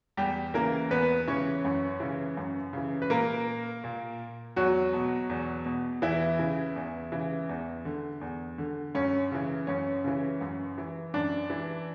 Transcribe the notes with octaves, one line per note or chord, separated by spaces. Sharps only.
E2 G3 G4
C#3 E3 A#3 A#4
E2 B3 B4
C#3 E3 C#4 C#5
F#2
C#3 E3
F#2
C#3 E3
B4
A#2 A#3 A#4
A#2
E2 F#3 F#4
B2
E2
B2
E2 E3 E4
C#3 E3
E2
C#3 E3
E2
D3
E2
D3
F#2 C#4
C#3 E3
F#2 C#4
C#3 E3
F#2
E3
F#2 D4
E3